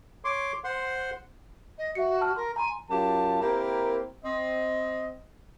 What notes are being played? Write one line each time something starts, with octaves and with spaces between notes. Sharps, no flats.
C#5 C6 D6
C5 F#5 C6
D#5
F#4 E5 C#7
A5 F6
A#4 C6
G#5 A#5 C6
F#2 F4 G4 A5
A#3 C4 E4 G4 A#4
C4 D#5